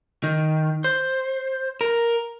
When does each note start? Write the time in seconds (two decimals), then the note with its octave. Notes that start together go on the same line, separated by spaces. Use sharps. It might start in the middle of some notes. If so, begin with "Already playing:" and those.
0.24 D#3
0.84 C5
1.81 A#4